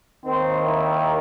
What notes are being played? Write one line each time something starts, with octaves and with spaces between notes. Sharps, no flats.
D#2 D#3 C4
E4